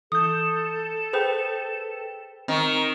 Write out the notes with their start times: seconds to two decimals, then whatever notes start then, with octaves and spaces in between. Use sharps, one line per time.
0.12 E3 A4 D#6 G6
1.13 G#4 B4 C5 G5
2.48 D#3 C4 C#6 C#7